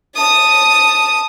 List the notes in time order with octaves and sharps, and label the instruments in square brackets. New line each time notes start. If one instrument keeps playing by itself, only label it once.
[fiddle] A5 D#6